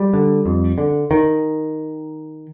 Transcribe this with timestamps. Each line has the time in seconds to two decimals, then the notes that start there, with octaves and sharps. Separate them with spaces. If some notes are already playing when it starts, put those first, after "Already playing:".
Already playing: G3
0.14 D3
0.46 F2
0.78 D3
1.11 D#3